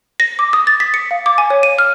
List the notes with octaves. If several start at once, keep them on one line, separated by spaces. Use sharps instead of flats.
A#6
D6
D#6
A6
B6
C#7
F5
D6
G#5
C#5
D#7
F6